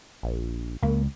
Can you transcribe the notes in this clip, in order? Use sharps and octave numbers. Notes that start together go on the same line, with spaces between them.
A#1
C#2 A#3